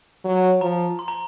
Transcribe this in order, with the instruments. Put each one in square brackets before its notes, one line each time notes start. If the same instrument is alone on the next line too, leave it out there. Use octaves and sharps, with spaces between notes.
[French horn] F#3
[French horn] F3 [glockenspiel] A#5
[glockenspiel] C6
A#5